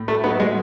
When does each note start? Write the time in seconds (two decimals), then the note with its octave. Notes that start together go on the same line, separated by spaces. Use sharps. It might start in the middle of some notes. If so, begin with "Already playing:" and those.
Already playing: A2
0.08 A3
0.24 F#3 A3 B3 D#4
0.40 G#3